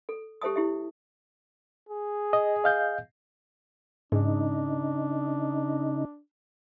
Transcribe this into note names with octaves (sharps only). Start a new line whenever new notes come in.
A4
G4 A4 C5 E5 A5 D#6
E4 G4 E5
G#4
D#5
D#5 F5 G6
G#2 C#3 D4 D#4